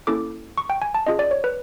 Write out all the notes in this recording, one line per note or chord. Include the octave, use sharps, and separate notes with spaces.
A#3 C#4 E4 A4 D6
C#6
G5
G#5
A5
C#4 F4 G#4 D#5
D5
C#5
B4